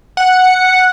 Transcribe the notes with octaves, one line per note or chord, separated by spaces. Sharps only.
F#5